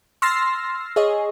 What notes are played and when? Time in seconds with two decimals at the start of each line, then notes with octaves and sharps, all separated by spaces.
0.22 C6 E6 F6 A6 A#6 C7
0.96 G#4 C#5 D#5